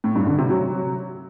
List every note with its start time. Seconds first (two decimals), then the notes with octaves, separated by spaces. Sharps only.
0.04 A2
0.15 G2
0.27 D3
0.38 C3
0.50 F#3